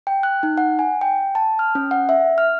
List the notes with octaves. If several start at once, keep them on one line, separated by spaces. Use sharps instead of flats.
G5
F#6
D#4
F#5
G#5
G5
A5
F6
C#4
F#5
E5
F6